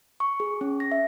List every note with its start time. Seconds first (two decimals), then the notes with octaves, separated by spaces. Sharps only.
0.20 C#6
0.40 G#4
0.61 C#4
0.80 A#6
0.92 E5